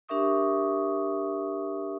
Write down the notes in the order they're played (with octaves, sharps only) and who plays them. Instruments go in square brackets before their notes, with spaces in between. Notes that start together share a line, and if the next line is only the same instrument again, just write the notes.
[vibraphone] D4 G4 A#4 E5 C#6 D#6